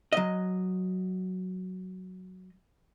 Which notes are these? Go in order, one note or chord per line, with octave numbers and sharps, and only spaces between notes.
F#3 D#5